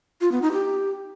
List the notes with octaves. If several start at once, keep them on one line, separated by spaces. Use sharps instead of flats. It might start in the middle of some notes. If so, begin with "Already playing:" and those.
F4
B3
D#4
G4